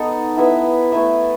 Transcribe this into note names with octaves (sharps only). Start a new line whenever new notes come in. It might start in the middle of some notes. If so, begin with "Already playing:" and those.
Already playing: B3 D#4 A4 D#5
B3 E4 B4 E5
A3 E4 B4 E5